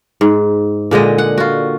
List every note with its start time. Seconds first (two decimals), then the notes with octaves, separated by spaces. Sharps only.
0.21 G#2
0.91 A#2 D3 G#3 D#5
1.18 F#5
1.38 F4 F#4